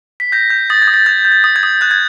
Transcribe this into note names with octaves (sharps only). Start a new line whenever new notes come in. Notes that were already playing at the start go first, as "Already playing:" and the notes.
B6
G6 A#6
G6
D#6 A6
G#6
D#6
A6
G6 G#6
G6
G#6
D#6
G#6
D#6
F#6 G6
G#6